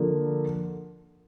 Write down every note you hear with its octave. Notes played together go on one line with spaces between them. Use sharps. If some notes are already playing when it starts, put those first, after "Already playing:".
Already playing: D3 F3 A#3